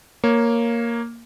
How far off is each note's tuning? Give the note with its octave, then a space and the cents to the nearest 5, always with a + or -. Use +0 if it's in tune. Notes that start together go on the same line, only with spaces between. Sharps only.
A#3 +0 C#5 +0